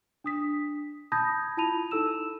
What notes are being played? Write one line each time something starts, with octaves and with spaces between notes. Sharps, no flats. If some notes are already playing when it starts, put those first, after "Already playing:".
D4 D#6 B6
A5 B5 D#6 G6 G#6 A#6
E4 F4 A5 B5 D#7 F7
D#4 E4 A4 A5 E6 E7